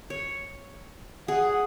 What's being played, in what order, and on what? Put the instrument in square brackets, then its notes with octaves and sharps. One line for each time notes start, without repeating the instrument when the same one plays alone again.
[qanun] C#5
[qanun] G#4 [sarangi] F#5